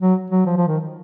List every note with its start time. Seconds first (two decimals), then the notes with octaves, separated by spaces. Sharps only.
0.01 F#3
0.31 F#3
0.46 F3
0.57 F3
0.67 D#3